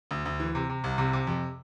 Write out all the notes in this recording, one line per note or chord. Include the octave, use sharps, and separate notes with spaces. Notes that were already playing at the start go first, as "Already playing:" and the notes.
D2
D2
E3
C3
C3
C2
C3
C3
F2